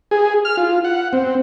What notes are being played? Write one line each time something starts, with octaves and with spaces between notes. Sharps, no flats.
G#4
F6
F4
F#5
C4